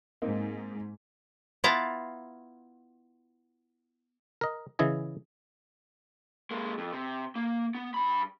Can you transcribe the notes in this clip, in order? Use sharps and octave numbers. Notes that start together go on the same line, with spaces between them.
G#2 A#3 C4 D#4
B3 E4 F4 A5 A#5
A#4 D#5
C#3 E3 E4 D#5 G#5
G#3 A#3
F2
C3
A#3
B3
G2 B5